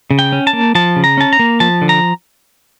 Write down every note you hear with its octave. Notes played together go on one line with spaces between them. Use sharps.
C#3
G5
C#4
A5
A#3
F3 A5
C#3
A#5
C#4 A5
A#5
A#3
F3 A5
D3
A#5